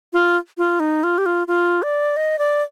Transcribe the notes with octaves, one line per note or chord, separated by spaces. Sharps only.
F4
F4
D#4
F4
G4
F4
F4
D5
D#5
D5